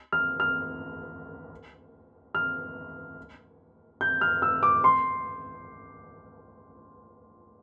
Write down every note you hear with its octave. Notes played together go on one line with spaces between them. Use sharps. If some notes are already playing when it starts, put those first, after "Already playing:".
F6
F6
F6
G6
F6
E6
D6
C6